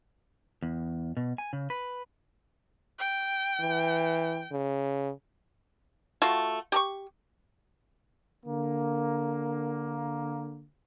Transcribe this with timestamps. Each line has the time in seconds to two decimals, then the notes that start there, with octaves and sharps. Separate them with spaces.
0.62 E2
1.17 B2
1.38 G#5
1.53 C#3
1.70 B4
2.99 G5
3.60 E3
4.52 C#3
6.22 A3 F4 F#4
6.72 G4 A#5 C#6
8.45 D3 A#3